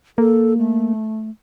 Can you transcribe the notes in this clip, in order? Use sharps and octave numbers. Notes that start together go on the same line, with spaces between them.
A#3 A4
A3